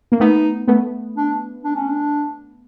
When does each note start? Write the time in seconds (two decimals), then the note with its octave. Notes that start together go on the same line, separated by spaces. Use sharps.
0.12 A#3
0.20 A3 B3 D#4
0.68 A3 B3
1.16 D4
1.64 D4
1.76 C#4
1.87 D4